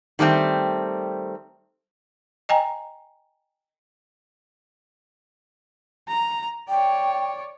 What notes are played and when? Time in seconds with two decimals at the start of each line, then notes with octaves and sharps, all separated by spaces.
0.19 D#3 G3 A3 B3 C4
2.49 D#5 G5 G#5 A#5
6.08 A#5
6.69 C#5 D5 G5